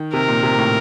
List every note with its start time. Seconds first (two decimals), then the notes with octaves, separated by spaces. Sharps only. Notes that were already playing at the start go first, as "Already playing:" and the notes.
Already playing: D#3
0.13 C3 A#4
0.28 A#2
0.43 C3
0.52 A#2
0.59 A2